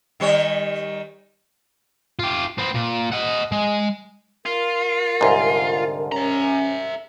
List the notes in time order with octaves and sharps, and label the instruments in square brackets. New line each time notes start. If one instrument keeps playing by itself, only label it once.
[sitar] D#3 G3 C#5
[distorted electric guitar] F4 G4
C4 B4
A#2
D#5 F#5
G#3
[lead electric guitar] F4 [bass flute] A#4
[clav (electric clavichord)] C2 G#2 [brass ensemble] D3
[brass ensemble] C#4 [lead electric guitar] E5 A#5